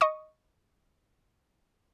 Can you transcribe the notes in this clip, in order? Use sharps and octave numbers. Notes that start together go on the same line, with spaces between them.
D#5 C#6 D#6